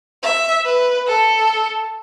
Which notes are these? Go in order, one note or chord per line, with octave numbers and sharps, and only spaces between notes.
E5
B4
A4